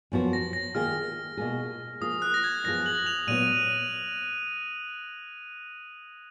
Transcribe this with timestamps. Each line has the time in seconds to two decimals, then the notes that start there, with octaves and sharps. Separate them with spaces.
0.12 F#2 F3 B3 F#4
0.33 A#6
0.53 A#6
0.75 D#3 A#3 F4 G#4 F6
1.37 B2 A#3 F4 G#4
2.01 F3 A#3 F4 G#4 D#6
2.22 F#6
2.34 A#6
2.44 G#6
2.64 F#2 F3 B3 F4 G#4 A#6
2.86 F#7
3.06 F7
3.27 A#2 F#3 B3 F#4 D#7